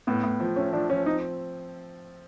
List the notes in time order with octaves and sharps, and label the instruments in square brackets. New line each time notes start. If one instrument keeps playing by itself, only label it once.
[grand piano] A2 [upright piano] B3
[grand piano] A2
F3
[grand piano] A3 [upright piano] C#4
[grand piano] F3 [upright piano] D4
[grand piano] F3 [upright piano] C#4
[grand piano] C4 [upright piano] D#4